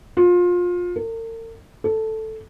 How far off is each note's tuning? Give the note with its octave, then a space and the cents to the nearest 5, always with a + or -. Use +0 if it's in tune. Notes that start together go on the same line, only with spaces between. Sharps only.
F4 +25
A#4 -45
A4 +0